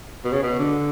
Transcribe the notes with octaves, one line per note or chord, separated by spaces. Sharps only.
B2
C#3
B2
D3